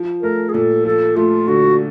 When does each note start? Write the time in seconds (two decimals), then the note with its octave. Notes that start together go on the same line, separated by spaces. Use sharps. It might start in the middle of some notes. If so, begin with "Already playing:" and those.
Already playing: F3
0.22 A3 A#4
0.49 G#4
0.54 A#2 A4
0.85 F3 A4
1.16 A3 F4
1.48 D3 F#4